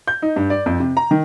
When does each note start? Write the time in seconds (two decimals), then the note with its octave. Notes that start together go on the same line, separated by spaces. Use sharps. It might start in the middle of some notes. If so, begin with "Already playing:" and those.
0.08 G6
0.22 D#4
0.36 G2
0.50 D5
0.66 F2
0.80 C3
0.97 A#5
1.11 D#3